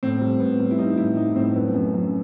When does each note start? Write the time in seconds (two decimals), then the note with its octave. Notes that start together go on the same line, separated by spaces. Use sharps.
0.03 A2 C4
0.21 G3
0.40 A2 B3
0.60 G3
0.71 E4
0.78 G3 D#4
0.97 A2 E4
1.16 G3 D#4
1.36 A2 C4
1.55 F#2 B3
1.74 F#2
1.94 F#2